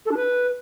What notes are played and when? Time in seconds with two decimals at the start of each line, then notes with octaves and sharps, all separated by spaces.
0.06 A4
0.11 D4
0.17 B4